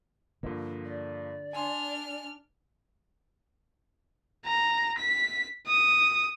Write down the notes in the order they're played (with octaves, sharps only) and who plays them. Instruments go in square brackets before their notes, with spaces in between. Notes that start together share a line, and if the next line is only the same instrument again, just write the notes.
[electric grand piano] G2 F3 A#3 [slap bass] D3
[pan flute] D5
[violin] D4 F6 [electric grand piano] G#5 C6
[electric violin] A#5
B6
D#6